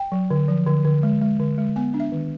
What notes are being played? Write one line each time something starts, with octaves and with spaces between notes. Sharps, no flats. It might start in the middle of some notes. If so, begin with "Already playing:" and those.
Already playing: G5
F#3
D3
F3
D3
D3
G#3
G#3
D3
G#3
B3 G#5
D4
E5
D#3